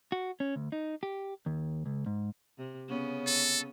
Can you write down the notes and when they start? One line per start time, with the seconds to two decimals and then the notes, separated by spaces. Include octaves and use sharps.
0.12 F#4
0.40 C#4
0.56 D2
0.72 D#4
1.03 G4
1.46 D#2
1.86 C#2
2.06 G#2
2.58 C3
2.88 C#3 B3 C#4
3.26 A4